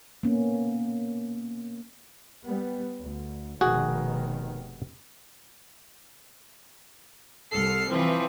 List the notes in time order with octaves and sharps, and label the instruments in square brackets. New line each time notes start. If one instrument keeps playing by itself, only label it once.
[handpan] A#3 B3 C#4
[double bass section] G3 B3
D2
[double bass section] F1 B2 D#3 [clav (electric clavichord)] F#4 G#4
[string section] C2 A4 F6 C7
E3 F3 C4